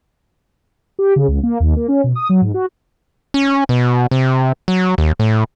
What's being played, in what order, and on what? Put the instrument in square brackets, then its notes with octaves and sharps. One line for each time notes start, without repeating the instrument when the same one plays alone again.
[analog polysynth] G4
C#3
C#2
A#3
D#2
A#3
C#4
B2
D#6
F#3
G#2
F#4
[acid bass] C#4
B2
C3
F#3
D#2
A2